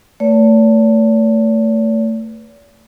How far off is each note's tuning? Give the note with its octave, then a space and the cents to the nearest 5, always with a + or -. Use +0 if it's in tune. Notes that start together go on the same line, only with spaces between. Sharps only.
A3 +20 B4 +0 D5 -45